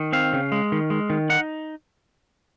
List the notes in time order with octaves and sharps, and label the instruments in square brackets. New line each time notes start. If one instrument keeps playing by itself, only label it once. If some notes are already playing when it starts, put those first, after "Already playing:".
Already playing: [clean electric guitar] D#3
C4 F5
C#3
G#3
D#3
G#3
D#3
D#4 F#5